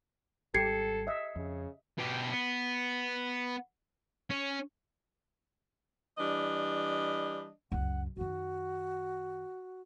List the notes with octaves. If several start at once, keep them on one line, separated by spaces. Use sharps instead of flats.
G#1 G3 G4 A4 G#6 C7 C#7
D#5 E5
F2 C#3
B2 G4
B3
C#4
E3 G3 D4 D#5
C#2 F#2 F#5
F#2 D#3 F#4